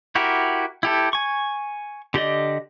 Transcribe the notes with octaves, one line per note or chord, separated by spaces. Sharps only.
E4 F#4 G4 A#4
E4 G4 A4
G#5 C#6
D3 G4 D5 D#5